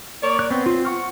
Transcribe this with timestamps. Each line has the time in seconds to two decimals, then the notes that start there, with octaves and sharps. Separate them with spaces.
0.23 A#3 C#5 D5
0.39 F#6
0.51 B3 C4
0.66 F4
0.85 F#5 C#6 F6